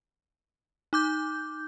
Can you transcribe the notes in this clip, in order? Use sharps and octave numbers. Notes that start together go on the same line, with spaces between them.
D#4 D6 G6